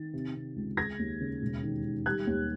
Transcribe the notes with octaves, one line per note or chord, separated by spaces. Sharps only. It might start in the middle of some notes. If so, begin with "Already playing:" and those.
Already playing: D#3 A6
C3
C3
C#2
G#3 G#6 A#6
D#2
C#3
E1
D#3
D#3
G3 F#6 G#6
D#2